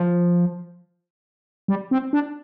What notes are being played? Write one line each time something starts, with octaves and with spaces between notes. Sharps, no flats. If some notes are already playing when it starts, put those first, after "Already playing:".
Already playing: F3
G3
C4
D4